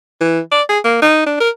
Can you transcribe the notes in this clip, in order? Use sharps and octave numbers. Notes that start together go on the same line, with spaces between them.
E3
D5
G#4
A#3
D#4
D4
A#4